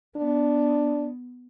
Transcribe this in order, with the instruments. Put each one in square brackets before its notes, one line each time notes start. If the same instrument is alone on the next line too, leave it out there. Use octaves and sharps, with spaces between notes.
[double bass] B3 [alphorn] D4